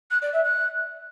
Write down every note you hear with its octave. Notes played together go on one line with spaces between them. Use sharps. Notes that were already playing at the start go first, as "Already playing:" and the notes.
F#6
D5
E5
F#6